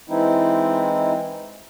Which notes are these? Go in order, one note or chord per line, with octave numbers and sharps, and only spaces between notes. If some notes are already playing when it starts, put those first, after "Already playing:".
E3 G#3 C4 D#4 E4